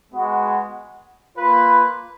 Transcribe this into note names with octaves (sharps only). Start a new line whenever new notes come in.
G#3 B3 F#4
A#3 F4 B4